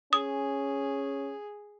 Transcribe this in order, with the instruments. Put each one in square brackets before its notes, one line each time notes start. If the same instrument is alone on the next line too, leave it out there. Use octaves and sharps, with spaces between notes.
[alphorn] C#4 [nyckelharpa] G#4 [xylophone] D#6